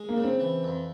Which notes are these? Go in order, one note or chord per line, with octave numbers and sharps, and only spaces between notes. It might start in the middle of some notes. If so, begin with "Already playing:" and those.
Already playing: G#3
A#3
C#3
C4
E3
F2